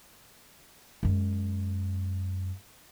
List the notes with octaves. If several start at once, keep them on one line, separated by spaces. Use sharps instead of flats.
F#2 G#3